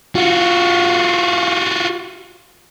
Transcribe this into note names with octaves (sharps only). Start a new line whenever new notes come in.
F4 F#4